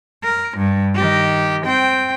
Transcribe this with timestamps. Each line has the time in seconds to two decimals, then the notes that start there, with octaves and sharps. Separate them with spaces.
0.24 A#4
0.58 G2
0.96 D#3 G4
1.66 C4 G5